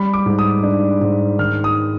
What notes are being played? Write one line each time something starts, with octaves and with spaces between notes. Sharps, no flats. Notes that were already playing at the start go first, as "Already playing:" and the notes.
Already playing: G3 B5
D6
G#2
D#6
D4
G#2
D#3 F6
D#6